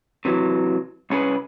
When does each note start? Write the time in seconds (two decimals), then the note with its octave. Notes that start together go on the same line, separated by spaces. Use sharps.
0.25 C3 E3 F#3
1.10 C2 C#4 G#4 B4